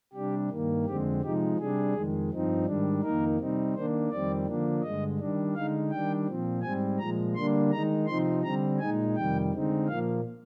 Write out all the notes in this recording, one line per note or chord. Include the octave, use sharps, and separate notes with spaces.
C3 G3 D4 G4
G2 D#3 A#3
F2 D3 G#3 C4 G4
C3 F3 G#3 D#4 G4
C3 G3 D4 G#4
F2 D#3 G#3
G2 F3 C4 D#4
G#2 D#3 G3 D4
F2 D#3 A#3 D#4 A#4
C3 G3 C4 D#4
D#3 A#3 D4 C5
F2 D#3 G3 C4 D5
D3 F3 A#3 D4
G2 D3 G#3 D#5
D#3 G3 D4
D3 G#3 D#4 F5
D#3 G3 D4 G5
A#2 F3 C4
G#2 G3 C4 G#5
A#2 F3 G#3 A#5
D3 G3 A#3 D4 C6
D#3 G#3 D#4 A#5
C3 F3 C4 D#4 C6
D3 G3 C4 A#5
A#2 G#3 D#4 G#5
F2 C3 D#3 G3 G5
D3 G#3 C4 D#4
A#2 F3 A#3 F5